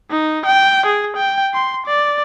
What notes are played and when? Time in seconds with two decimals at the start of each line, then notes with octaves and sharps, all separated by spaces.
0.11 D#4
0.46 G5
0.86 G#4
1.16 G5
1.53 C6
1.87 D5